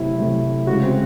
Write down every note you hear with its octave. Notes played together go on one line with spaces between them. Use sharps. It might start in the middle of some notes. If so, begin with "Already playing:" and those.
Already playing: C3 F#3 A3 E4
C3 F#3 A3
C#3 G#3 F#4
C4